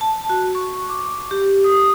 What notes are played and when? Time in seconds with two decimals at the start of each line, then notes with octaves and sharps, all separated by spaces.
0.01 A5
0.29 F#4
0.55 C#6
0.89 D6
1.31 G4
1.64 D#6